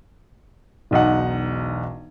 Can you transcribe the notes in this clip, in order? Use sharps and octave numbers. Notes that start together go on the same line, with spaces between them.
E1 B1 D#4 F#5